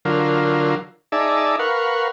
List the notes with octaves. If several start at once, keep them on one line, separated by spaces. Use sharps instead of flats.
D3 F#3 F4 A#4
D#4 G#4 D5 E5 A5
A#4 B4 F5 F#5 C#6